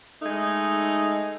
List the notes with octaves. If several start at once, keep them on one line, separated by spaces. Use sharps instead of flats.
G#3 A3 D#4